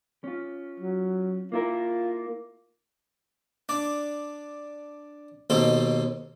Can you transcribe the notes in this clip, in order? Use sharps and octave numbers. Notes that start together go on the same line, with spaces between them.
C#4 F4
F#3
A#3 E4 F4 A#4
D4 D5
D#2 B2 C4 D#4 A4